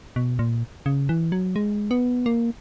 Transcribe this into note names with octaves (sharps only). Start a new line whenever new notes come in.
B2
A#2
C#3
E3
F#3
G#3
B3
A#3